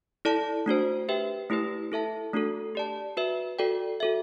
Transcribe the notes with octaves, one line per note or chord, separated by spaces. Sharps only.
E4 A4 D5 A5
A3 D4 F#4 C5
G4 B4 E5 G5
A3 E4 G4 B4
E4 A4 E5 A5
A3 D4 F#4 A4
G4 D5 A5
F#4 B4 E5
F#4 A4 D5 G5
F#4 A4 E5